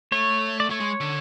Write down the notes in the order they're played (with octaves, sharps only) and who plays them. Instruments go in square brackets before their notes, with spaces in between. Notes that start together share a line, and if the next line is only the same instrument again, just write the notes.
[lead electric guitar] A3 [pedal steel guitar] C#5
[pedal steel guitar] D5
[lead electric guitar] A3 [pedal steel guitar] C#5
[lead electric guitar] G#3
D3